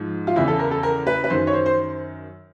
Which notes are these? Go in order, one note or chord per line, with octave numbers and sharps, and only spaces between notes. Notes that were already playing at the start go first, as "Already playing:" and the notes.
Already playing: G#2 F3
F4
E2 C#3 E3 E4
A4
A#4
A4
A#4
B4
B4
F#2 D#3 C5
C#5
C5
C5